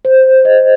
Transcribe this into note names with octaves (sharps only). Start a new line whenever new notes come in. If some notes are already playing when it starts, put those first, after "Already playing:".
C5
D#5